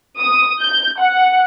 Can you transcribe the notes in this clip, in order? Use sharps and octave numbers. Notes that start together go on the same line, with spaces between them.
D#6
G6
F#5